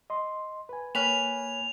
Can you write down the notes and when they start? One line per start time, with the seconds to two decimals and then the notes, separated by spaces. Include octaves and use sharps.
0.10 D#5 C6
0.69 B4 G#5
0.95 A#3 B4 C#5 G#5 B5 F6 F7